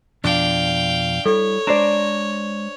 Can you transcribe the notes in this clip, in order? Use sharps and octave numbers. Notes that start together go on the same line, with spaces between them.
F2 B2 F3 D4 F5 G5
G3 E4 A4 C#5
G#3 D4 C5 D5 A#5 A#6 E7